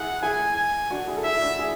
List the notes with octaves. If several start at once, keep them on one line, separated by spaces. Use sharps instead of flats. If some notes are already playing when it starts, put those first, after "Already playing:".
Already playing: E4 G#4 F#5
E4 G#4 G#5
G#5
D4 F#4
E4 G#4
A4
E4 G#4 E5
E4
D4 F#4
E4 G#4